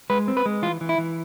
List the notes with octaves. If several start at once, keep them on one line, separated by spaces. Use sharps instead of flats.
G#3 B4
C4
B4
G#3
E3 F4
E3
E4
E3